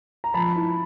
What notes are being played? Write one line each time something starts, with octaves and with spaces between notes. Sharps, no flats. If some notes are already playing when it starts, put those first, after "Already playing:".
A#5
F3 A5 B5
E4